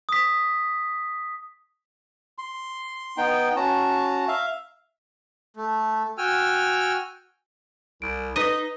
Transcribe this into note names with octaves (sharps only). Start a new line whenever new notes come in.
D#6 B6
C6
B3 D#4 G5
C#4 F#4 A5 A#5
E5 F5
A3
F#4 G5 G#5 E6 F6
C2 D7
D#4 B4 D#5 B6 D#7